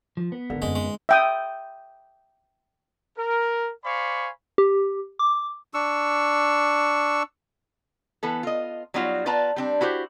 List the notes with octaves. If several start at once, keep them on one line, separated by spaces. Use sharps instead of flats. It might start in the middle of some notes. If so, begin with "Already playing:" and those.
F3
B3
G#1 D3 A#4
F#2 G#3 C4
G#1 G#3
E5 G5 D#6
A#4
C5 D5 F5 G#5 B5 C#6
G4
D6
D4 C#6 E6
E3 B3 A4
F4 D#5
F#3 G3 B3 D#4 F4 F#4
B3 F4 B4 D5 A5 A#5
G3 C4 D4
E4 F#4 G4 C5